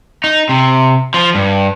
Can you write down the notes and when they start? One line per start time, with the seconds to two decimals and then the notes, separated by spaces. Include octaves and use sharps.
0.24 D#4
0.49 C3
1.14 F3
1.35 G2